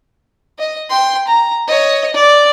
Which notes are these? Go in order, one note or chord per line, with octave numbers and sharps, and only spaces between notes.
D#5
G5 C6
A#5
C#5 D#5
D5